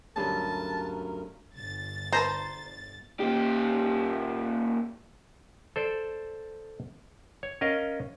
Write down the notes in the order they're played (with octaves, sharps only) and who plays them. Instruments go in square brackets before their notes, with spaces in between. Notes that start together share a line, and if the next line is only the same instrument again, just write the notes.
[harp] D2 G2 A4 [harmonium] F#3 C#4 A#4 [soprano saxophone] A5
[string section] G1 A6
[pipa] B4 A5 A#5 [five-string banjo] C5
[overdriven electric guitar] A#2 G4
[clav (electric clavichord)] A4 C5 D5
C#5
C#4 A#4 D#5 F5